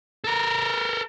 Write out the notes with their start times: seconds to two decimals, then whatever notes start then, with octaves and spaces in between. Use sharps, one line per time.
0.24 A4 A#4